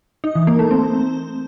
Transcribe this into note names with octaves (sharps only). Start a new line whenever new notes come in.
D#4
E3
A#3
A3
C4